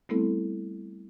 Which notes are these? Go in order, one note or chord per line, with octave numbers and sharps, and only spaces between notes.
G3 A3 B3 C4 E4 A4